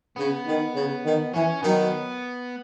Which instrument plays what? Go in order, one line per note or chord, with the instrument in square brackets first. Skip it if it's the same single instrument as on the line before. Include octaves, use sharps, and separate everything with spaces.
[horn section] C#3 [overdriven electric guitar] B3
[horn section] D#3
C#3
D#3
[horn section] E3 [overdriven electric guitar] C#4
[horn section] D#3 F#3 [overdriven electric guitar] B3